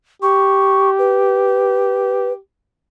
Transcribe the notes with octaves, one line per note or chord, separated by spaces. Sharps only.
G4 C#6
B4